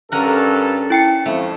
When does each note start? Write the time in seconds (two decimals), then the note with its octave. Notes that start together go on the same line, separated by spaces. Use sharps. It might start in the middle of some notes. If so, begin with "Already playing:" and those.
0.12 G2 C#4 A4 A#4 F#5
0.90 E4 G5 C#7
1.26 F2 A3